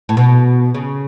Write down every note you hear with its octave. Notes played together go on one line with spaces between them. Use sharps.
A2
B2
C#3